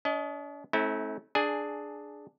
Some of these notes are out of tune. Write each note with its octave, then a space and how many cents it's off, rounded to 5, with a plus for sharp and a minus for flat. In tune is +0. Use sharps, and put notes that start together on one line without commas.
D4 -45 D#5 +15
A3 -20 C4 +40 E4 -45
D4 +5 G#4 +10 G#5 +0